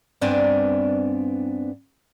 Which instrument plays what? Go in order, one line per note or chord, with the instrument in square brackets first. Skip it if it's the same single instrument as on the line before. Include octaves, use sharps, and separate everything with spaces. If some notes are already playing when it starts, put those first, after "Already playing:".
[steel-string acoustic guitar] G2 B3 C4 D4 D5 G#5